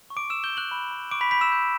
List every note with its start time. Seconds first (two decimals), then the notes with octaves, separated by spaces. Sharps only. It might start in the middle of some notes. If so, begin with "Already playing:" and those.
0.10 C#6
0.17 D6 D7
0.30 E6 E7
0.44 G6 G7
0.50 E6
0.57 F#6 F#7
0.71 B5
0.91 B5
1.11 C#6 D6 D7
1.21 B5 B6
1.31 B5 G6 B6
1.41 E6 E7
1.52 G6